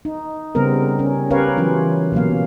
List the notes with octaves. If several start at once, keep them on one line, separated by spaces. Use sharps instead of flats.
D#4
C#3 G3 B3 C4 A#4
C#4
C#4 G4 A#4 B4 C#5 F5
E3 F#3 C#4 F4
B2 F#3 A#3 F5